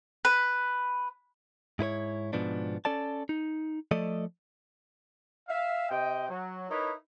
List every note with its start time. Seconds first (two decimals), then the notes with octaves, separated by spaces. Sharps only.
0.25 B4
1.79 G#2 E4 B4 C#5
2.33 G#2 B2 F3 B3 D4
2.85 C#4 A4 D5 A5
3.29 D#4
3.91 F3 A3 A4 D5 D#5
5.48 E5 F5
5.89 C3 D#5 G5
6.28 F#3
6.70 D#4 E4 A#4 B4 C#5